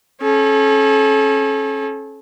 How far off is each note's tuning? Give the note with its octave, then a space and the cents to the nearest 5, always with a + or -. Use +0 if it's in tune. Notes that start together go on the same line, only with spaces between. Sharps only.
C#4 -30 A4 -35